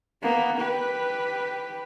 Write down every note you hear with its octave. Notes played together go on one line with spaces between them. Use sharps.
A#3 B3
G4 B4